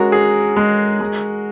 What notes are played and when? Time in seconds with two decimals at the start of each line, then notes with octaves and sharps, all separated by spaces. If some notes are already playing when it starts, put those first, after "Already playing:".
Already playing: G#3 C#4 F#4 A#4
0.12 G#4
0.57 G#3
1.01 G#3